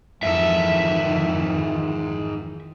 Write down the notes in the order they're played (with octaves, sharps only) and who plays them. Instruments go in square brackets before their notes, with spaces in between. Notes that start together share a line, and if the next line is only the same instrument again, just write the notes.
[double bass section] F2 D#3 E3 [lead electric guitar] G#2 A4 [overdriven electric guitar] E5